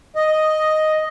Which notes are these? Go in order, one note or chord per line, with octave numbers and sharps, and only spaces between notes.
D#5